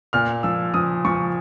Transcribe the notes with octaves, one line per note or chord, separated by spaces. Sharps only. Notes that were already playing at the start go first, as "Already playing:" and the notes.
A#2 F6
F3 E6
F3 D#6
F3 C#6